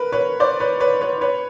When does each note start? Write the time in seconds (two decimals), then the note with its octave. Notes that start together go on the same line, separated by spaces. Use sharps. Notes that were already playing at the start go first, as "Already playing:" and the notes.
Already playing: A#4 B4
0.12 B4 C#5
0.40 C5 D5
0.60 B4 C#5
0.80 B4 C#5
1.01 B4 C#5
1.21 B4 C#5